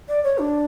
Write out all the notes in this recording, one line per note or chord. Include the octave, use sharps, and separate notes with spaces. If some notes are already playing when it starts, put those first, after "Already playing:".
D5
C#5
D4